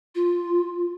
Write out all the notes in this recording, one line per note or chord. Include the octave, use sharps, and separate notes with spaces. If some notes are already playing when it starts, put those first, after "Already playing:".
F4